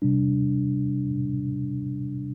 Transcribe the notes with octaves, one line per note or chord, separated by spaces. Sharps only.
C3 G3 D4